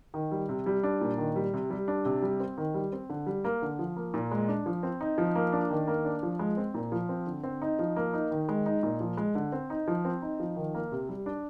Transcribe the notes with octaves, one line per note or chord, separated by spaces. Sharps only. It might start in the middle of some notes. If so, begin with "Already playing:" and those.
D#3
G3
C3
G3
D4
A#2
D#3
G3
C3
G3
D4
C3
G3
C4
D#3
G3
C4
D3
G3
A#3
D3
F3
A#3
A#2
G#3
D4
F3
C4
D#4
F3
A#3
D4
D#3
A#3
D4
F3
G#3
C4
A#2
F3
C4
D3
C4
D#4
F3
A#3
D#4
D#3
G#3
D#4
A#2
F3
G#3
D3
C4
D#4
F3
C4
D#4
F3
D#3
A#3
C3
G3
D4